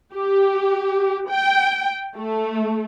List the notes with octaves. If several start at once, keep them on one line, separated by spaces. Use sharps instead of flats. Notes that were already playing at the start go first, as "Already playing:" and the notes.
G4
G5
A3